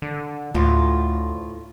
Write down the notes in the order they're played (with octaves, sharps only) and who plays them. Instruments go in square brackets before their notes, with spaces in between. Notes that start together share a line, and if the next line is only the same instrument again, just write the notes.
[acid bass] D3
[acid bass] D2 [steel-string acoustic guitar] A2 F4